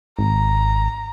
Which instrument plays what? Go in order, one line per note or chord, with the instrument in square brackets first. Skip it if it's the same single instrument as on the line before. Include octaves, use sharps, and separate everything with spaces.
[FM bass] G#1 [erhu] A#5